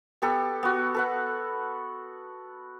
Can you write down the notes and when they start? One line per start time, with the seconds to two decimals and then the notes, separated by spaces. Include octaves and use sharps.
0.22 B3 G4 A4
0.63 B3 F#4
0.94 A4 B4 F#5